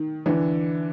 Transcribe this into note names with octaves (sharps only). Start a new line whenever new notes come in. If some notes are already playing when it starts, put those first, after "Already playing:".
Already playing: D#3
D3 E3